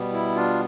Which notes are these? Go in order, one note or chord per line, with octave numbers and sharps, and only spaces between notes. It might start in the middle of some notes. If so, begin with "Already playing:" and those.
Already playing: B2 G3 B3
E4
D4 F4